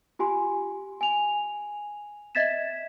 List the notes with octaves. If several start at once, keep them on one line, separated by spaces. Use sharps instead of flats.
F4 G4 G#5 C6
G#5 F7
D#5 E5 G#6 A6 B6 E7